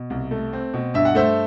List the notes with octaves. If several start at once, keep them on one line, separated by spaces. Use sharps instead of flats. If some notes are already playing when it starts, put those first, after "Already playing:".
Already playing: B2
C2
A3
C4
B2
G2 E5
F#5
A3 C5 E5